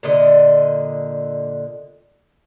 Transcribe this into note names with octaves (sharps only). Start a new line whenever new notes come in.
A#2 D3 D#5